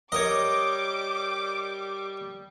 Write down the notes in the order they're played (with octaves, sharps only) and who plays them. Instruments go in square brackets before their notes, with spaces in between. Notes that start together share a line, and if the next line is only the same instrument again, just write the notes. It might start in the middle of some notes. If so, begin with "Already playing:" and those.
[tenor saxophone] G3 [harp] A#4 C#5 [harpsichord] D#5 [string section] D6